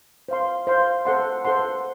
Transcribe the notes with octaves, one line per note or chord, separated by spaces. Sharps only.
C5 F5 C6
C5 F5 C6
A4 C5 F#5 C6
A4 C5 F#5 C6